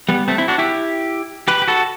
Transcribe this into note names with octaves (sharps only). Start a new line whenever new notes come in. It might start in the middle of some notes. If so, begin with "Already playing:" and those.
G3 B3
A3 C4
C4 E4
D4 F#4
E4 G4
G4 B4
G4
F#4 A4